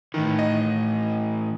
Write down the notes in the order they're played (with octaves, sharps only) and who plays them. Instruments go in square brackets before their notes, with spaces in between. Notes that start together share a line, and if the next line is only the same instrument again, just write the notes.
[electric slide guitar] A2 E3 [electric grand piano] D#3
[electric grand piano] D#5